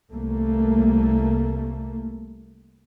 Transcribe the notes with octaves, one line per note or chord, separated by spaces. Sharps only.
C2 A3 A#3